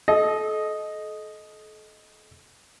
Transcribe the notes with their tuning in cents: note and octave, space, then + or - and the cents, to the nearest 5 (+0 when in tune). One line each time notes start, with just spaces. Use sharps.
A4 -35 D#5 +0